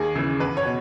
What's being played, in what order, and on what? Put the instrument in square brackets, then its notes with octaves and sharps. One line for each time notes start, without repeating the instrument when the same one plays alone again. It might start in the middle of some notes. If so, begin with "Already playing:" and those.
Already playing: [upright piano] D#2 G#4
C#3 E3
E2 B4
C#5
B2